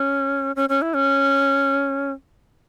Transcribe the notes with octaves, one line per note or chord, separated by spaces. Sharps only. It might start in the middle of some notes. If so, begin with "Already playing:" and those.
Already playing: C#4
C#4
C#4
E4
C#4